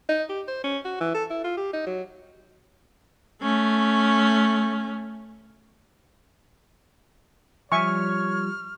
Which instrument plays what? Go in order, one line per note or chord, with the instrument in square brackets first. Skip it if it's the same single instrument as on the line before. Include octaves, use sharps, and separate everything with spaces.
[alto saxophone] D#4
G4
C5
C#4
F#4
E3
A4
E4
F4
G4
D#4
F#3
[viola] A3 C#4
[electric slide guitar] F3 G3 [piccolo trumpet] C#5 [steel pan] E5 G#5 C#6 [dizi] F6